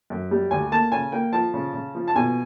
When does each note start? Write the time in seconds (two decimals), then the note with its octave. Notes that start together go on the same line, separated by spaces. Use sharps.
0.10 F#2
0.31 G3
0.51 D2 G#5
0.72 A#3 A5
0.92 C#3 G#5
1.12 A#3 G5
1.33 F3 A5
1.54 C#3
1.74 C#3
1.95 F3
2.08 A5
2.16 B2 G#5